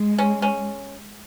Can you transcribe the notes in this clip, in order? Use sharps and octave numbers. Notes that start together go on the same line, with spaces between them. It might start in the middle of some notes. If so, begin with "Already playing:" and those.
Already playing: G#3
C#4
C#4